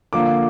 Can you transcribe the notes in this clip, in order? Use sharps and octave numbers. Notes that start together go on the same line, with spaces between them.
D3 F3 A#3 F4 D6